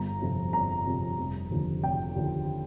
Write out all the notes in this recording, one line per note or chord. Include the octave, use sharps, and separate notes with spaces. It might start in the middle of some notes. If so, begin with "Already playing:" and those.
Already playing: G1 A#5
F2 C3 F3
G1 A#5
F2 C3 F3
F1
D#2 D3 F3
F1 G5
D#2 D3 F3